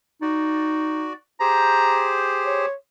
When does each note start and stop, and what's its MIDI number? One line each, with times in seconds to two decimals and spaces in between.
0.22 1.11 63
0.22 1.13 66
0.22 1.13 74
1.40 2.66 67
1.40 2.66 68
1.40 2.66 72
1.40 2.13 82
2.46 2.73 73